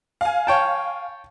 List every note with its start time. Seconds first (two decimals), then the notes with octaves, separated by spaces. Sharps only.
0.21 F5 G#5
0.47 C#5 G5 A5